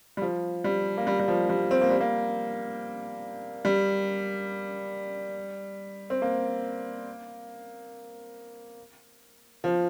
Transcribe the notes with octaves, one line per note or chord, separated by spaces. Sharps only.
G3
F3
G3
A#3
G3
G3
F3
G3
C4
A#3
G3
A#3
G3
C4
A#3
F3